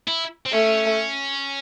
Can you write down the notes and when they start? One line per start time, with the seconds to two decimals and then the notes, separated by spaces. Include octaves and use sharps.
0.08 E4
0.46 C4
0.53 A3 C#4